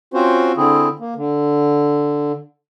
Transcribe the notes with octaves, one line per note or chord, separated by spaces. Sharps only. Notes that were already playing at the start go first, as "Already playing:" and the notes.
C4 C#4 F4 F#4 C5
D3 C4 E4 G#4
A#3
D3